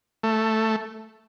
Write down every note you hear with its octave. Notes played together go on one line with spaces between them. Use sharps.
A3